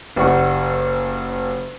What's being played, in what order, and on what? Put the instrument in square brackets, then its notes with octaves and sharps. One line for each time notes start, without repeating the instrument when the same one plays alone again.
[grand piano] F#1 G4 D5 F#5 C#6